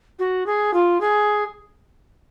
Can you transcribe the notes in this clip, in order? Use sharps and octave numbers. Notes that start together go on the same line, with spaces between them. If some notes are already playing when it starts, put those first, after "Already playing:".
F#4
G#4
F4
G#4